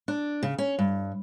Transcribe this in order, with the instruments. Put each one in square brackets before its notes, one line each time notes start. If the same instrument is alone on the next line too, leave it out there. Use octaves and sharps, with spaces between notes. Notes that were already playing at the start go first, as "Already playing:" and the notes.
[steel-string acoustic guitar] D4
C#3
C#4
G2